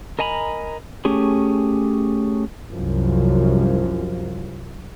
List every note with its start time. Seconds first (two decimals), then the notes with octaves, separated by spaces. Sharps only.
0.19 A#4 D#5 G#5 A#5 B5
1.05 A3 C#4 G4 G#4
2.71 C2 F#2 F3